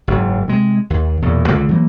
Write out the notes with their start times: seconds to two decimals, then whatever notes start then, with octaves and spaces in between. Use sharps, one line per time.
0.07 F#1 G#2 F#3
0.48 C3 G#3
0.90 D#2
1.22 E1 E2 A#2
1.48 C#2 D3
1.69 E3 F#3 A3 A#3